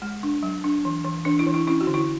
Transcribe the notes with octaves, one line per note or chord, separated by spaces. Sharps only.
G#3
D4
F#3
D4
E3
E3
E3 D4
E4
E3
E4
C#4 E4
F#4
D3
E4